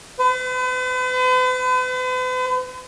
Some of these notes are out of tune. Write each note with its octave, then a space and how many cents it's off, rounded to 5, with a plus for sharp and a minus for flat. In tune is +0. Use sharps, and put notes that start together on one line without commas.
B4 +45